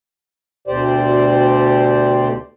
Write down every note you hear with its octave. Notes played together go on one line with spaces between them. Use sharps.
D2 B2 G4 C5 D5